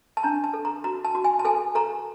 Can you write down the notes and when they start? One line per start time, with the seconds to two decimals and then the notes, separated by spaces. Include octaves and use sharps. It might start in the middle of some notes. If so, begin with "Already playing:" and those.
0.17 A5
0.23 D4 A#5
0.44 A5
0.54 A4
0.65 A#5
0.84 F#4 A#5
1.05 A5
1.15 F#4
1.24 G#5
1.39 A5
1.45 A4 G#5
1.75 A4 A#5